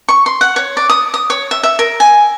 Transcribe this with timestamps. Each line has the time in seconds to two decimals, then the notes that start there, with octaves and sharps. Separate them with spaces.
0.09 C#6
0.26 C6
0.41 F#5
0.56 C#5
0.77 D5
0.89 D#6
1.14 D#6
1.30 C#5
1.51 E5
1.63 E5
1.79 A#4
2.00 G#5